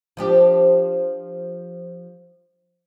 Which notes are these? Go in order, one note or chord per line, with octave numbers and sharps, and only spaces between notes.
F3 D4 G4